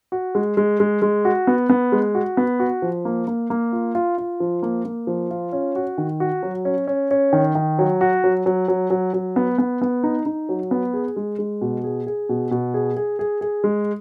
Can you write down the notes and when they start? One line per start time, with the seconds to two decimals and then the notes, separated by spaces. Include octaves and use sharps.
0.12 F#4
0.35 G#3
0.57 G#3
0.80 G#3
1.02 G#3
1.25 F#4
1.47 B3
1.70 B3
1.92 G#3
2.15 F#4
2.37 B3
2.60 F#4
2.82 F3
3.05 A#3
3.27 A#3
3.50 A#3
3.72 F4
3.95 F4
4.18 F4
4.40 F3
4.63 A#3
4.85 A#3
5.07 F3
5.31 F4
5.53 C#4
5.76 F#4
5.98 D#3
6.20 F#4
6.43 F#3
6.65 C#4
6.87 C#4
7.11 C#4
7.33 D#3
7.55 D#3
7.79 F#3
8.01 F#4
8.24 F#3
8.46 F#3
8.68 F#3
8.90 F#3
9.13 F#3
9.36 B3
9.58 B3
9.82 B3
10.03 D#4
10.26 D#4
10.49 F#3
10.71 B3
10.94 G#4
11.16 G#3
11.39 G#3
11.61 B2
11.84 G#4
12.07 G#4
12.29 B2
12.51 B2
12.74 G#4
12.97 G#4
13.19 G#4
13.41 G#4
13.64 G#3